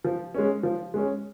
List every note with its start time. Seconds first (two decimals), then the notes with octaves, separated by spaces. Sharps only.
0.04 F3
0.35 G#3 C#4
0.63 F3
0.94 G#3 C#4